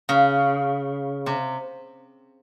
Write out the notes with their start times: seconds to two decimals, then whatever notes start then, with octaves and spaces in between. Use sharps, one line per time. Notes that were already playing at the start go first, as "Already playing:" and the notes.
0.09 C#3
1.26 C3